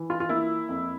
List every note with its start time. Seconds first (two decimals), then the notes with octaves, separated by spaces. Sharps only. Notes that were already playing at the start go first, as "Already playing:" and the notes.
Already playing: E3
0.10 F4
0.20 F4
0.29 A#3 E4
0.69 F2